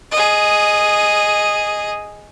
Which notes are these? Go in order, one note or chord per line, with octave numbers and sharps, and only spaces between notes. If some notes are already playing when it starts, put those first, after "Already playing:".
G#4 D#5